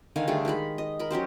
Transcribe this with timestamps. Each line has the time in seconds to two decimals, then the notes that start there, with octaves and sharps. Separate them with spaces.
0.16 D3 D#3 F5 G#5
0.27 D3 G3 A3 G#4
0.45 D#3 G#3 G#4 B5
0.78 D#5
0.99 A#4 B5
1.11 F#3 C#4 G4 C5